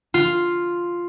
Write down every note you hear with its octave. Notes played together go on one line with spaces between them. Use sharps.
F4